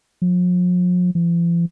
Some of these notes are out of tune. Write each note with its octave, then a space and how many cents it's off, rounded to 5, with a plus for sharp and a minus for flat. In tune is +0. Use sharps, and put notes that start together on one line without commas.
F3 +45
F3 -45